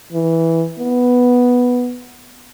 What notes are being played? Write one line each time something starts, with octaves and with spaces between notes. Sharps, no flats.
E3
B3